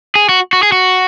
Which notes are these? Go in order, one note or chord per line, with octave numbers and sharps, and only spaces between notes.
G#4
F#4
F#4
G#4
F#4